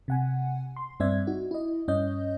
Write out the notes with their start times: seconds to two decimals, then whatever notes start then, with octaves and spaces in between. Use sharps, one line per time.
0.08 C3 F#5 G#5
0.76 C6
1.00 G2 C4 D5 E5 G#6
1.27 D#4 F#4
1.51 E4 D#5
1.88 G2 C#4 C#5 D#5 G6